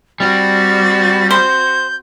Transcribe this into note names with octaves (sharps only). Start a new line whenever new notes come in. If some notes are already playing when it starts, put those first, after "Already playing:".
G3 C4 F#4 A6
C5 G6